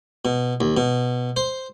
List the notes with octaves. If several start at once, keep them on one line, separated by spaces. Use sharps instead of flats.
B2
D#2
B2
C5